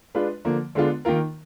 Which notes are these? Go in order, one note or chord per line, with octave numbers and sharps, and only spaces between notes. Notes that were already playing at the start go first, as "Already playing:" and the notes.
G#3 D4 F4 B4
D3 F3 A#3
D3 G#3 B3 D4 F4
D#3 A#3 F4 A#4